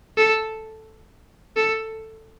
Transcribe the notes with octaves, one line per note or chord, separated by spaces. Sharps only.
A4
A4